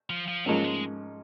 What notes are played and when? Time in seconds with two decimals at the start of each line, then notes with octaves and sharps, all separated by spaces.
0.10 F3
0.28 F3
0.46 G#2 F3 F#3 A#3 C#4
0.64 G#3